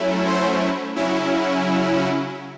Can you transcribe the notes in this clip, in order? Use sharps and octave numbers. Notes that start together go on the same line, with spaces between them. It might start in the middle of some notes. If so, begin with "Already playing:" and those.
Already playing: F#3 A3 C#4 E4
C5
C#3 F#3 C#4 E4